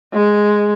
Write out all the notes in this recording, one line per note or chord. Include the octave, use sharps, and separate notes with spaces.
G#3